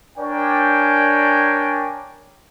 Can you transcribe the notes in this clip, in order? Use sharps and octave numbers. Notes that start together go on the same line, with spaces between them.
D4 A#4 C#5 D5 G5 G#5